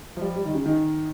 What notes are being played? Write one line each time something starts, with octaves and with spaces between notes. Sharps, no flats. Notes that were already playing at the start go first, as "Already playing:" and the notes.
F3
G3
G3
D#3
C#3
D#3